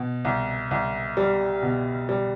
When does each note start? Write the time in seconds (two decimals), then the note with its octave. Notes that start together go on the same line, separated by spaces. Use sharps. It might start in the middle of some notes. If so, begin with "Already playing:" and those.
Already playing: B2
0.25 C2
0.71 C2
1.17 G3
1.63 B2
2.09 G3